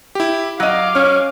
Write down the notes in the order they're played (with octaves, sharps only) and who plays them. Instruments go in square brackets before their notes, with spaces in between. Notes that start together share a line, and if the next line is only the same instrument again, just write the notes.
[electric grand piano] E4 G4
[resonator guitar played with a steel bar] F#3 D#5 [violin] F5 D6 [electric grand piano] F#6 D#7
[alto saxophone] C#4 [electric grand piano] F6